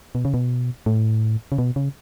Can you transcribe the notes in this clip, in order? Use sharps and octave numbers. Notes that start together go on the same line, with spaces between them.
B2
C#3
B2
A2
C#3
B2
C#3